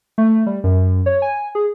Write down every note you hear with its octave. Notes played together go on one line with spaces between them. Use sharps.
A3
G3
F#2
C#5
G#5
G#4